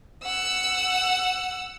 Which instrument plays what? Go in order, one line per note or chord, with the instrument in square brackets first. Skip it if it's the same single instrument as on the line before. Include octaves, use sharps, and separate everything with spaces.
[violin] F#5 E6